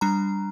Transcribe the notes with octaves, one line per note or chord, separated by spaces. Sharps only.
G3 D4 A#5